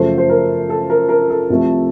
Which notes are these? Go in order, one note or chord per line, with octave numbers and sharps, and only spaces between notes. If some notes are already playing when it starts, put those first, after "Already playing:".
Already playing: F#2 C#3 F3 A3 A4 C5
C5
A#4
A4
A#4
A#4
A4
C2 C3 F3 A3